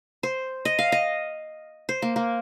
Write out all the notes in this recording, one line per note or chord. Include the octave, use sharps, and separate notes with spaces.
C5
D#5
F5
D#5
C5
A#3
A#3